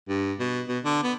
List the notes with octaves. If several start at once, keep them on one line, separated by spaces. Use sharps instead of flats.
G2
B2
B2
D3
B3